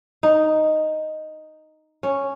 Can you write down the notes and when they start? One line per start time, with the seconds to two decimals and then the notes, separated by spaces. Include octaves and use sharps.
0.23 D#4
2.03 C#4